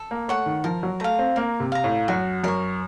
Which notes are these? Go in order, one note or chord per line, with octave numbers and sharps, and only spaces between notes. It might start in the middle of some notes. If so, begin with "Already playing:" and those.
Already playing: A4
A#3
A3 C#5 F#5
D#3
F3 A#4
F#3
A3 F5 A#5
C4
A#3 A#4
C3
F5 A#5
A2
F#2 F#4
F#2 A#4 C#5